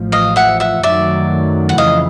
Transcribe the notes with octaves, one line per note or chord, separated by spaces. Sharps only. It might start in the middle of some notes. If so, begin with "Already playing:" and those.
Already playing: A1 A2 F3
D#5 F5
E5 F#5
E5 F#5
F#2 D#3 F#3 A3 D5 E5
F#5
F2 C#3 E3 D#5 F5